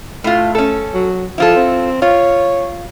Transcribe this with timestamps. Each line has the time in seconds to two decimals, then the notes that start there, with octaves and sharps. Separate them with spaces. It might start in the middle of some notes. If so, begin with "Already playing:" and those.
0.24 A2 A3 F4
0.55 C#4 A4
0.94 F#3
1.38 F3 E4 F4 A4
1.56 C4
2.02 F4 C#5